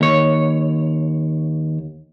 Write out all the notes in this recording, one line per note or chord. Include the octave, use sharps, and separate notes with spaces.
D#2 C#5